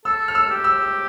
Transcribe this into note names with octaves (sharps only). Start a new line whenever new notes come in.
A4 E6
F6
E6
G4
E6